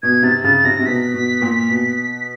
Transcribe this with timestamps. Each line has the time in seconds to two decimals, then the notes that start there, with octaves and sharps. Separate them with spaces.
0.03 B2 G#6
0.23 C3 A6
0.44 C#3 A6
0.64 C3 A#6
0.79 C3
0.86 B2 B6
1.14 B2
1.42 A#2
1.69 B2